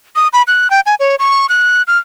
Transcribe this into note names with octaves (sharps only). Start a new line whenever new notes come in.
D#6
B5
F#6
G5
G#5
C#5
C#6
F#6
F6